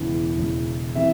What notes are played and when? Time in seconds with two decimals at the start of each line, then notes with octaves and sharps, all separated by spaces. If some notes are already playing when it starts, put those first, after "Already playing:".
Already playing: E1 E2 C#3 E3
0.37 E1 E2 C#3 E3
0.95 C3 E3 E5